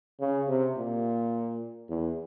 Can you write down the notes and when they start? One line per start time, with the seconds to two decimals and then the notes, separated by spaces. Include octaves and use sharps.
0.20 C#3
0.48 C3
0.77 A#2
1.89 E2